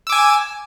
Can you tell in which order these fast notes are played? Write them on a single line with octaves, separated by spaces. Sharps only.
E6 D6 G#5